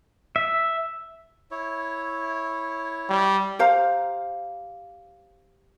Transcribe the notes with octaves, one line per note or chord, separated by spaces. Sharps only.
E5
E4 C#5
G3
G4 C5 F5 A#5